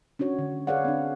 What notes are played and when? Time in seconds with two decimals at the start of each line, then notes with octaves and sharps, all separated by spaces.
0.19 C#4 D4 F#4 C#5
0.39 D3
0.67 G#4 B4 C#5 D5 F5 F#5
0.85 C4 D4